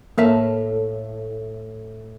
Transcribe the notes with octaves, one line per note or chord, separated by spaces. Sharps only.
A2 A3 A#3 A#4 E5 F5